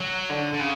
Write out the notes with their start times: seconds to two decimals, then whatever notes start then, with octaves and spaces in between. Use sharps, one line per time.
0.01 F#3
0.30 D3
0.53 D3
0.59 C#3